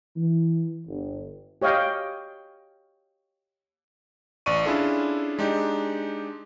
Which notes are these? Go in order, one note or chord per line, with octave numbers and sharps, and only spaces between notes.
E3
G1
G4 C#5 D#5 F5 G5
A1 D5 C#6 D#7
C#4 D4 E4 F4 G#4 A4
G#3 D4 D#4 G4